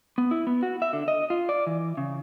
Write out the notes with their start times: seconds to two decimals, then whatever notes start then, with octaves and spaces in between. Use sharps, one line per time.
0.18 B3
0.31 E4
0.47 B3
0.63 F#4
0.82 E5
0.93 D3
1.08 D#5
1.30 F4
1.49 D5
1.67 E3
1.97 C#3